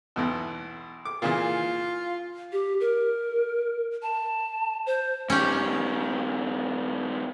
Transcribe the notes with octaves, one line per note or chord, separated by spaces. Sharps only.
B1 E2 B2
D6
A#2 C#3 E3 F4
G4
A#4
A5
C5
G2 D#3 C#4 G4